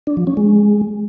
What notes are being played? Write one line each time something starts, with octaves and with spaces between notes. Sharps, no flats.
D4
F3
C#4
G#3